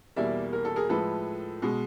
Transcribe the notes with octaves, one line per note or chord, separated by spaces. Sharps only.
E2 B2 G3 A#3 D5 E5
A#4
A4
G#4 A#4
A2 F3 G#3 A4 B4
B2 G#3